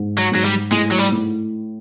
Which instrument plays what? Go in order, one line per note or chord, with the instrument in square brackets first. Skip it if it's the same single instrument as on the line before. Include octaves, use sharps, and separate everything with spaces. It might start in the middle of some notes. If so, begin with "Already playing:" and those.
Already playing: [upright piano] G#2
[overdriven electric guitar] F#3
[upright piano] G#2 [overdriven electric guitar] F#3
[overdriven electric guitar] G3
[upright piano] A2 [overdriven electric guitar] G#3
[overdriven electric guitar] F#3
G3
[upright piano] A2